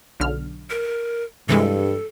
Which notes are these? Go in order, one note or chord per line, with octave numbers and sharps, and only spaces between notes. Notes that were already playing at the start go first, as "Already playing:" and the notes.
B1 D3 F6
A#4
G2 C3 E3 G#3 A4